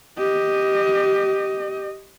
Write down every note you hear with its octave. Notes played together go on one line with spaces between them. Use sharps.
G4 D#5